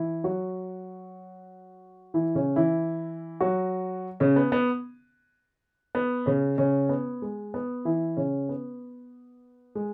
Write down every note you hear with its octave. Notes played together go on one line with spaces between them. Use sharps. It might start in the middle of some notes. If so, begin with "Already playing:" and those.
Already playing: E3 E4
F#3 F#4
E3 E4
C#3 C#4
E3 E4
F#3 F#4
C#3 C#4
B3
B3
B3
C#3 C#4
C#3 C#4
B3
G#3
B3
E3 E4
C#3 C#4
B3
G#3